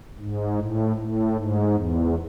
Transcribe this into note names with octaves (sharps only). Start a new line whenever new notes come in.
G#2
A2
A2
G#2
E2